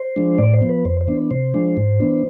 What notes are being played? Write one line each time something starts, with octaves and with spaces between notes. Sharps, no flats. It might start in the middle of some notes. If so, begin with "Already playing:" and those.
Already playing: C5
F3 G#3 D4
A2 D5
C5
F3 B3
B4
F2 C5
C5
E3 B3 D4
C3 C5
F3 G#3 D4
G#2
E3 B3 D4